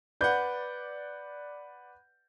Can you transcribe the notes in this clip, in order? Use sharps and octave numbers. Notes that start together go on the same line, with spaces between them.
B4 D5 F#5 G6